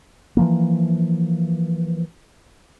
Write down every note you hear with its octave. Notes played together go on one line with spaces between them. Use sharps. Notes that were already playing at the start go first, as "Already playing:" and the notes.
E3 F3 A#3